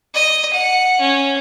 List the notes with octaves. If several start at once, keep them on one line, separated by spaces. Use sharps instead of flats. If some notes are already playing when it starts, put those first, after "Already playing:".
D#5
F#5
C#4